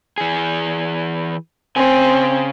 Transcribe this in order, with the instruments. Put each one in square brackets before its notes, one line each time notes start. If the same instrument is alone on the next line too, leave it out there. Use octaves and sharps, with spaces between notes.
[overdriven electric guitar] E3 G#4
[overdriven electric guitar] C#3 G#5 [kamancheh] C4